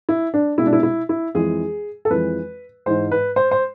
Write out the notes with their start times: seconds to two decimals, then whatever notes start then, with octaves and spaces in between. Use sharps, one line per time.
0.09 E4
0.34 D4
0.58 C2 B2 G#3 E4
0.66 D4
0.73 E4
0.83 E4
1.09 E4
1.35 F2 E3 G#3 G#4
2.05 A4
2.10 F2 E3 G#3 B4
2.86 G#2 E3 G#3 C5
3.12 B4
3.36 C5
3.51 C5